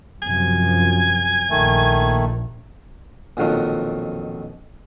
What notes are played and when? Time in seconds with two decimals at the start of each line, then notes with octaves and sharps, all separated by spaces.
0.22 F#2 C3 F3 G#5
1.50 A#1 D#3 A3
3.37 A#1 F2 B2 D#3 F#3